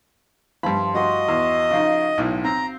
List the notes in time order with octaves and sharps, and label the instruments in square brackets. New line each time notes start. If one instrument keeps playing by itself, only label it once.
[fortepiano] G2 B5 [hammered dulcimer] F3
[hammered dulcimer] F#4 C6 [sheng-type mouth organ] D#5
[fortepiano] E2
C#3 F3 D#4
B1 A2
[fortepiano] C4 [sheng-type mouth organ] A#5